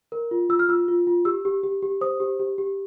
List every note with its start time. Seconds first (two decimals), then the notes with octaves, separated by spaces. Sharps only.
0.12 A#4
0.31 F4
0.49 F4 E6
0.59 F6
0.69 F4 E6
0.88 F4
1.07 F4
1.25 G4 E6
1.45 G4
1.63 G4
1.82 G4
2.01 C5 D#6
2.20 G4
2.40 G4
2.58 G4